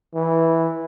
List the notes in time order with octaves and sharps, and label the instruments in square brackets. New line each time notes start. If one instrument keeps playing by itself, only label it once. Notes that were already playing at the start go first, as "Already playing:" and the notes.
[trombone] E3